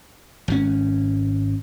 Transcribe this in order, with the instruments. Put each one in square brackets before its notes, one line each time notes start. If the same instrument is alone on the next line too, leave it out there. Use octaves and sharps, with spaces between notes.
[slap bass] G#1 B2 C#4